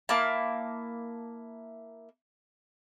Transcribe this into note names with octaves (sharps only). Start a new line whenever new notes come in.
A#3 E4 A5